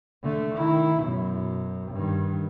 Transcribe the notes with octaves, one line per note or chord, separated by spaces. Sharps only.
D3 A3
D#3 E4
F#2 B2
G2 D#3